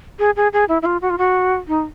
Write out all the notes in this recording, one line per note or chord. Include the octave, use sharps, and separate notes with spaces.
G#4
G#4
G#4
E4
E4
F4
F#4
F4
F#4
D#4